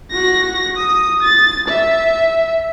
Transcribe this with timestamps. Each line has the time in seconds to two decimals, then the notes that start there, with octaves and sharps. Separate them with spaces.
0.11 F#4 A#6
0.76 D#6
1.23 A6
1.68 E5